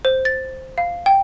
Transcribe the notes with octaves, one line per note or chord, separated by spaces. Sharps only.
C5
A6
F5
G5